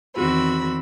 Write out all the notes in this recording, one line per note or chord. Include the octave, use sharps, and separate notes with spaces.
E2 D#3 C4 F#4 B5 E6